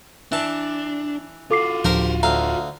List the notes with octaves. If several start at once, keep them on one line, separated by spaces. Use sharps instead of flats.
E3 D4 A5
F4 F#4 A4 D6 C7
D1 F3 D4 G4 A#4 C5
D2 F5 A#5